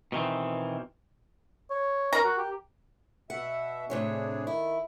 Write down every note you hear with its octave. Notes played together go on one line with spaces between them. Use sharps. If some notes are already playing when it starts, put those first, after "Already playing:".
B2 D#3 E3 C4
C#5
C#4 A#4 A#5
F#4
G4
B2 E5 F#5
A2 C3 D4 G#4 C#5
D#3 E4